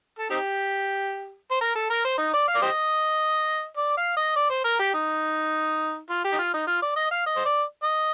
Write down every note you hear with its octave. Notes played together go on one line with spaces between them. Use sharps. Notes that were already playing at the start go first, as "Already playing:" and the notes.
A4
C4 D#4 G4
C5
A#4
A4
A#4
C5
D#4
D5
F5
D5
G4 C5 D#5
D5
F5
D#5
D5
C5
A#4
G4
D#4
F4
G4
D#4
F4
D#4
F4
D5
D#5
F5
D#5
C5
D5
D#5